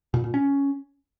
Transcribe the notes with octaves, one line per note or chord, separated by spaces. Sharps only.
A#2
A#2
C#4